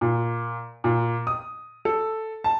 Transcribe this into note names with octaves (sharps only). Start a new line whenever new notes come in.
A#2
A#2
D#6
A4
A5